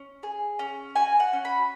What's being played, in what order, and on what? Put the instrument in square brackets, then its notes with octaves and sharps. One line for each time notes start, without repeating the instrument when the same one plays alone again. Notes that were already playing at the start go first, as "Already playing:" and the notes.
Already playing: [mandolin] C#4
G#4
C#4
F#4 G#5
F#5
C#4
B5